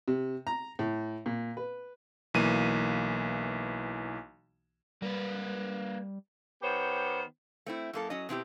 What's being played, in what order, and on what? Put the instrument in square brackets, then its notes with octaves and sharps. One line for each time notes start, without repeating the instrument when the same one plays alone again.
[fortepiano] C3
A#5
A2
A#2
B4
[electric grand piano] B1 E3 A#3 D#7
[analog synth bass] G3 [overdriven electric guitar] A#3 B4
[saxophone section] D#3 B3 G4 C5 C#5
[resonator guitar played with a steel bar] A3 C4 E4
F#2 A#3 A4
F#3 C#4 D#5
B2 C4 E4 G4